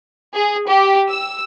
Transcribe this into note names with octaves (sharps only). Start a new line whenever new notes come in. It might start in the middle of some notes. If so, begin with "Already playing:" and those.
G#4
G4
E6